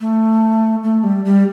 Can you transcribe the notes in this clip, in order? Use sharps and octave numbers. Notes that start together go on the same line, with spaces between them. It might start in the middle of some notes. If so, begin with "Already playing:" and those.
A3
A3
G3
G3